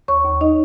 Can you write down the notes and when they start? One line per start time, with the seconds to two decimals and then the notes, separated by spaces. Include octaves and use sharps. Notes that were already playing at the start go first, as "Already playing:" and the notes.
0.08 D#2 C#5 C#6
0.24 D#2
0.41 D#4 D#5